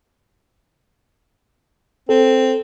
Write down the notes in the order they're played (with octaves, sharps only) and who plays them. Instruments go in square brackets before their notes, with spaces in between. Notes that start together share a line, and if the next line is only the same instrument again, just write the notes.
[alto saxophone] C4 [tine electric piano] A4